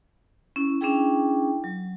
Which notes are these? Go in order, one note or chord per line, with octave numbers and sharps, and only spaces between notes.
C#4 E4
C#4 D4 E4 G#4 G5
F#3